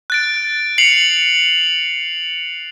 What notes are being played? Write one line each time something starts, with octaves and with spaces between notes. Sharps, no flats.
F#6 A6 D7
C7 C#7 F7 F#7